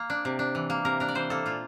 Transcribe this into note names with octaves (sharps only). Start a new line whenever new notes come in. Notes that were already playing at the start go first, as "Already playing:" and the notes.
Already playing: A#3
D4
C3
D4
E3
A#3
C3 A#4
D4 A#4
D5
E3 C5
A#3 A4
A#2 F4